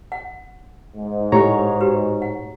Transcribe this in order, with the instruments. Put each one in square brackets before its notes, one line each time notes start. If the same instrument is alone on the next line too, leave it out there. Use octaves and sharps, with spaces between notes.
[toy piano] F#5
[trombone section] G#2
[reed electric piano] A2 C#5 A#5 [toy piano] G4
[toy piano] F#4 G4 B4
F#5